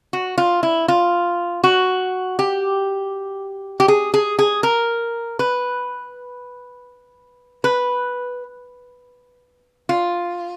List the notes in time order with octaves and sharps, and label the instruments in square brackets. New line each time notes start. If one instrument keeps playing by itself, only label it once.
[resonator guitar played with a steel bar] F#4
F4
E4
F4
F#4
G4
G4
G#4
G#4
G#4
A#4
B4
B4
F4